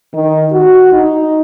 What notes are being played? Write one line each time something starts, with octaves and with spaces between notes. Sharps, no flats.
D#3
F#4
D#4